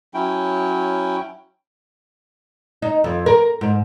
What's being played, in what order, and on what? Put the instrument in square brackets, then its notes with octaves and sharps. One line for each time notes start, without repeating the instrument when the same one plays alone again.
[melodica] F#3 C#4 E4 G5
[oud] D#4
F2
A#4
G#2